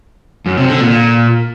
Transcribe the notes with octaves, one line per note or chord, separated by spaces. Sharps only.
F#2
C3
D3
A#2